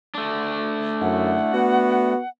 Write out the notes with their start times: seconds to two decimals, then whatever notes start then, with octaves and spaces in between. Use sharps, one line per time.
0.15 A3 D4
1.01 F#2 E4 F#5
1.54 B3 F#4